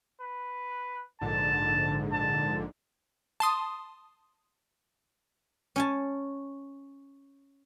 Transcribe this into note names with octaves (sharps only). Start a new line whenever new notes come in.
B4
A#1 G#2 D3 A5
A5
A5 C6 D#6
C#4 G#5 A5